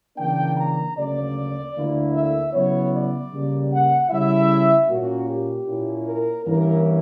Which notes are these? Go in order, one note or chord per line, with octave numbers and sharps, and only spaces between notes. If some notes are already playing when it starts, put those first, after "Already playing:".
C#3 E3 A#3 D4 G5
A#5
D2 C#3 F#3 A#3 D5
D2 D3 A#3 E4
E5
C#3 F#3 B3 E4 C#5
D5
C#3 G3 A#3
F#5
C#3 G3 C#4 E4 E5
A#2 A#3 C#4 F#4
G4
A#2 A#3 C#4 E4
A#4
G2 E3 A#3 C#4 E4 A#4